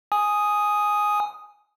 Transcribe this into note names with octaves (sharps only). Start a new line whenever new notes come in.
G#5 D#6